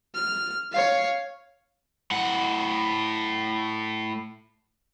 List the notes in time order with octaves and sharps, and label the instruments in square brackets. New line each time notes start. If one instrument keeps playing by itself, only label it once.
[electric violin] F6
C#5 F5
[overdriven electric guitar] A2 F#5